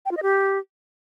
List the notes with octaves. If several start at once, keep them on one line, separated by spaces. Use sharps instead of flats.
G5
F4
D#5
G4